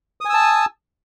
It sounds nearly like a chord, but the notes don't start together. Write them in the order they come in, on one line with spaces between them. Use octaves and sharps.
D#6 G#5 E6 A5